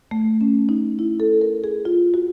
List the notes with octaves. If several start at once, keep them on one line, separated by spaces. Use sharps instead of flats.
A3
C#4
D#4
E4
A4
A#4
G#4
F4
F#4